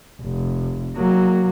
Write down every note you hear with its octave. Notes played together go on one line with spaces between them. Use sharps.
F1
F#3 A#3